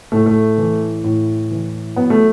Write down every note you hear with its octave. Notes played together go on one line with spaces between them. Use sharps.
A2 A3
A3
E3
A2
E3
F#3 B3
A3